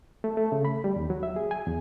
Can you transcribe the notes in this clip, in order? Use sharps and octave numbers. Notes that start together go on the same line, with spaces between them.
A3
A3
C#3
B5
G3
D#2
F#3
E5
G#4
G#5
E2